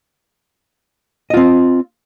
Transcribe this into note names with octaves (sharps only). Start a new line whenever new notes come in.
C4 F4 D#5